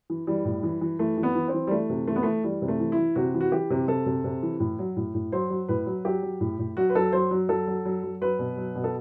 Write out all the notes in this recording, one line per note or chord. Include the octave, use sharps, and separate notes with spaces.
E3
E3 G3
A2
E3
E3
E3 A3
E3
B3
E3
C4
E3
G3
E3 A3
C3
E3 A3
B3
E3 A3
E3 G3
C3
A3
E3
E4
E3
C3 F#4
E3
F#4
E3 G4
C3
C3 A4
C3
C3
E3
A2
F#3
A2
A2
F#3 C5
F#3
A2 B4
F#3
F#3 G4
F#3
A2
A2
F#3 F#4
B4
F#3 A4
F#3 C5
F#3
F#3 A4
F#3
F#3
F#3
F#3 B4
B2
F#3
B2
A4